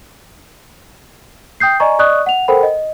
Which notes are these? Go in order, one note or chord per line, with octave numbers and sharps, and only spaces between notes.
G5 D#6 G6 C7
D5 D#5 G#5 A#5 C#6
D5 D#5 C#6 D#6 F#6
F#5 F7
A4 A#4 C5 F#5 G5 B5
D#5